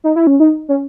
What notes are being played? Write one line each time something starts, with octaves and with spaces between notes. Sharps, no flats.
D#4
E4
C#4
D#4
C#4